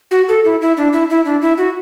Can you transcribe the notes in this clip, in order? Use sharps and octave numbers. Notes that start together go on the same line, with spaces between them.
F#4
A4
E4
E4
D4
E4
E4
D4
E4
F#4